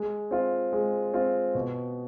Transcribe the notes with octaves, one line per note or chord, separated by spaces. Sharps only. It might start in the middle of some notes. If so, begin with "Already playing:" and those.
Already playing: G#3
C4 F4
G#3
C4 F4
B2